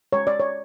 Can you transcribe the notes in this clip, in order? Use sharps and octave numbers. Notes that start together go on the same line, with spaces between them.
G#3 C#5
D5
C#5